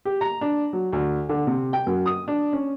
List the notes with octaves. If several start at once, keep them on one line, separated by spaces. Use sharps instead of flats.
G4
A#5
D4
F#3
D2
D3
C3
G5
F#2
D#6
D4
C#4